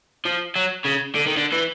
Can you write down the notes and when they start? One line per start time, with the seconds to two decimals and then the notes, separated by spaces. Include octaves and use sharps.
0.25 F3
0.56 F#3
0.85 C#3
1.16 D3
1.27 D#3
1.37 D3
1.53 E3